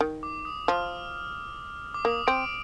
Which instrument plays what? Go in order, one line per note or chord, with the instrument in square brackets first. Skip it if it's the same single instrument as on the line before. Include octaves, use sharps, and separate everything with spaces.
[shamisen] D#3
[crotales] D6
D#6
[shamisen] F3 [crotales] F6
[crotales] D6
[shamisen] A#3 [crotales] D#6
[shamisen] C4 [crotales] D7